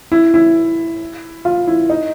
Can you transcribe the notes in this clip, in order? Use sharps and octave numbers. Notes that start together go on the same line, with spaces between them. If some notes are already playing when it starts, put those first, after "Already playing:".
E4
E4
F4
E4
D#4